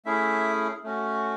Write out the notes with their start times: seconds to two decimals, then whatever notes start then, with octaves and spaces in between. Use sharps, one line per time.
0.05 A3 C#4 E4 G#4 E5
0.84 A3 C#4 F#4